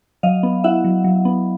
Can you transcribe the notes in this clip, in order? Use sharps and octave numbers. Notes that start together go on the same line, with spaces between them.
F#3 D#5 F5
B3
E4 E5 F#5
F#3
F#3
B3